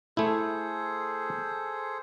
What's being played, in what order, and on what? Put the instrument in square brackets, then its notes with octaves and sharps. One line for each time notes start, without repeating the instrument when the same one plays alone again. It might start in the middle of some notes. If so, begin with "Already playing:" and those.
[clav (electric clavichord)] A3 E4 [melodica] G#4 A4 C5